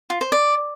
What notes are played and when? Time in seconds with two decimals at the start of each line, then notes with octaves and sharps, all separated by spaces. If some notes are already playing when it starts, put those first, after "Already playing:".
0.10 F4
0.21 C5
0.32 D5